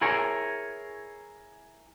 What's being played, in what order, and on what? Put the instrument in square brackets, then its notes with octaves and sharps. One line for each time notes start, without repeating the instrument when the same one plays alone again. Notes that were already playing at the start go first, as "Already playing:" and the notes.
[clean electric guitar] E4 G#4 A#4 C#5